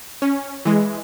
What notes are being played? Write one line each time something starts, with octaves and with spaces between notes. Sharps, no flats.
C#4
E3 G#3